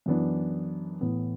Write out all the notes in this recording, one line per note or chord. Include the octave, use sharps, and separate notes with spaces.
F#2 E3 B3 D4
A2 E3 B3